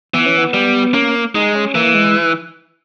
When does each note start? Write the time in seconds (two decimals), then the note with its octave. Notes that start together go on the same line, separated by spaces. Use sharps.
0.14 E3 B3
0.26 C#4
0.38 B3
0.54 G3
0.94 A#3 C#4
1.35 G#3 D#4
1.55 C#4
1.75 E3 A#3
1.94 G#3